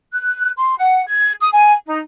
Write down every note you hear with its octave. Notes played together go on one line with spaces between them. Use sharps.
F#6
C6
F#5
G#6
D#6
G#5
D#4